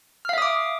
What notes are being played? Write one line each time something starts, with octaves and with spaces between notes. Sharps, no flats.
E5 F5 D6 D#6 F6